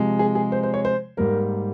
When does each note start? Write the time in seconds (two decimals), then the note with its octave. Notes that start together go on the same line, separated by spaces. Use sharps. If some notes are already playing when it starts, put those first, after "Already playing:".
Already playing: C3 F3 G#3
0.19 G#4
0.35 G#4
0.52 C5
0.63 C5
0.74 C#5
0.85 C5
1.17 G#2 G3 A#3 A#4